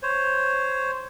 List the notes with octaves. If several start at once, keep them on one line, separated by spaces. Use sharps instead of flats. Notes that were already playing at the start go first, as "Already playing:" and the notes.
C5 C#5